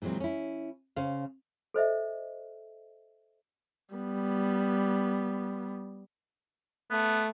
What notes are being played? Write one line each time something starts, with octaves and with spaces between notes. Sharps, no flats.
A#2 E3 F#3 G#3 C4
C#4 E4
C#3 C5 F5
A4 C5 D#5 E5
G3 B3
A3 B3